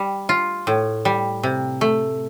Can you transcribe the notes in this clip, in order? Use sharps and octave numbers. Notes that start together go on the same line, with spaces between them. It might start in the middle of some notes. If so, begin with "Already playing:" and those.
Already playing: G3
F4
A2
G3
C3
A3